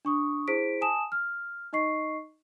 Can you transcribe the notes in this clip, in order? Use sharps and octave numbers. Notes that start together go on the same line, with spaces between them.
D4 C#6 D#6
E4 G#4 C5 B6 D7
G#5 A5 D#6 E7
F6
D#4 D#5 C#6 C7